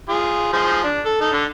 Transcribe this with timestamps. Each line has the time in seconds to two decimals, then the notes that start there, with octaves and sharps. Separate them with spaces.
0.09 F4 G#4
0.53 F3 G#4 C5
0.84 D4
1.06 A4
1.21 D#4 A4
1.33 D3